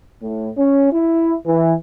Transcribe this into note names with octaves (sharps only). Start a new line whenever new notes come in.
A2
C#4
E4
E3